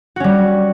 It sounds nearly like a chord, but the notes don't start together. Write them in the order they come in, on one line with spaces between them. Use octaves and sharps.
F#4 C#4 G3